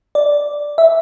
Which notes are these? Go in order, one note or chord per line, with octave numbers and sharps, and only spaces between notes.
D5
E5